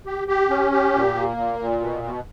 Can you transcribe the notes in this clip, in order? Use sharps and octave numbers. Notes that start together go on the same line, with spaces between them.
G4
G4
C#4
G4
A#2
A#3
A#2
A#2
B2
B2